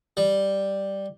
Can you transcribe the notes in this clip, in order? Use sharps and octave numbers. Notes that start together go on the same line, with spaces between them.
G3